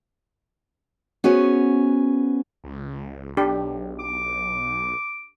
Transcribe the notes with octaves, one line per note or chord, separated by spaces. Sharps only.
B3 C#4 F#4 G#4 C5 C#5
C#2
B1 D4 G4
D6